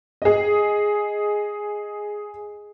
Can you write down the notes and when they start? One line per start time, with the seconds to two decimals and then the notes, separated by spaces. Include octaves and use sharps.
0.22 G#4 D#5